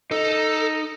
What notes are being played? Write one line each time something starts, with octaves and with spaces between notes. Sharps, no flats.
D#4 A4